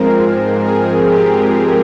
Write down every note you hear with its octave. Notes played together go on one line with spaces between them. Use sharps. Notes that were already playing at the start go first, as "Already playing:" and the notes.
Already playing: G#2 F3 G#3 C4 A#4
G#4
G4